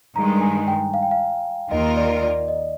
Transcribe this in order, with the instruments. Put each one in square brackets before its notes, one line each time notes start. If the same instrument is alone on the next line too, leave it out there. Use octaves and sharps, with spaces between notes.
[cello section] G2 D#3 G#3 [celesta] A#5
[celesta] G#5
G5
F5
G5
F5
[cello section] D#2 D#3 A#3 F4 A#4 [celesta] D#5
[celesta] D5
D5
D#5